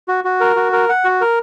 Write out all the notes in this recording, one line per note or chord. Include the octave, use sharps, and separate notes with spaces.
F#4
F#4
A#4
F#4
A#4
F#5
F#4
A#4